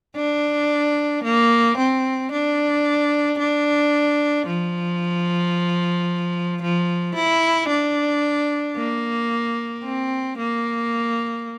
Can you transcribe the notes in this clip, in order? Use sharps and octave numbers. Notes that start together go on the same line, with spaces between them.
D4
A#3
C4
D4
D4
F3
F3
E4
D4
A#3
C4
A#3